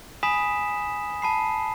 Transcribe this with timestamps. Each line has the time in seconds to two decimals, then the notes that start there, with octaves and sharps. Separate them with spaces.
0.23 G#5 B5 D#6 B6 E7
1.22 A5 B5 C7